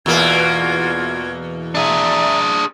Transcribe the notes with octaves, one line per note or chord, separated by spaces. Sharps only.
E2 B2 A#3 F4 F#4 G#6
D4 G#4 D5 E5 A#5